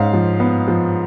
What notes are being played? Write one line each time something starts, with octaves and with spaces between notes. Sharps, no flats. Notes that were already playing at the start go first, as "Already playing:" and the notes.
Already playing: G#2 C#4 F5
F3
B3
F3